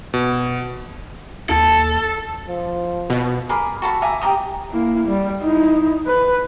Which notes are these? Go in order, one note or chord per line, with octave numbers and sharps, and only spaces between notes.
B2
D#2 A4
F3
B2
G#4 A#4 B5 D6
F#4 A4 B5
E5 G#5 A#5 D6
G4 G#5 A#5 D#6
A#3 E4
G3
D#4 E4
B4